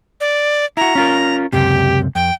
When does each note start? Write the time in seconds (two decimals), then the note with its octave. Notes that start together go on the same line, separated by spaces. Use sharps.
0.21 D5
0.77 E4 F#4 A#5
0.95 C#4 F4 A#4
1.53 C#2 F#2 C3 G4
2.15 F2 G5